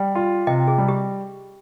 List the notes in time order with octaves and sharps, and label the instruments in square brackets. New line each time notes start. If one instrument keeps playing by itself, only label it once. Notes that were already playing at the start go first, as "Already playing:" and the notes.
Already playing: [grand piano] G3 [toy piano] G5
[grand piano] F4
[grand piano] C3 [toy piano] D#5 G5
[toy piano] G#4
[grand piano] G3
[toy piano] G4